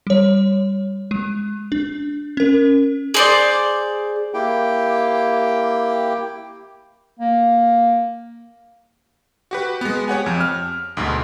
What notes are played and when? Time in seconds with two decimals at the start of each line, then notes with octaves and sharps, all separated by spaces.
0.07 G3 C#5
1.11 G#3
1.72 D4
2.37 C#4 A#4
3.14 G#4 C5 D5
4.34 A#3 E4 G4 G5
7.20 A#3
9.51 F#4 G4 B4
9.81 G#3 B3
10.08 G4 C#5 F#5 G#5
10.26 F2
10.41 F6
10.97 D2 G#2 B2